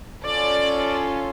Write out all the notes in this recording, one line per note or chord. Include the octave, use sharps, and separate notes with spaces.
C#4 F4 A4 D5